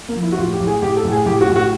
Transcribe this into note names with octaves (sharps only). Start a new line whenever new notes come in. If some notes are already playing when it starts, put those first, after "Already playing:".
A#3
F3
E4
F#4
A2 F4
G4
A2
G#4
A2 G4
A4
A2
G#4
A2 G4
F#4
A2
F#4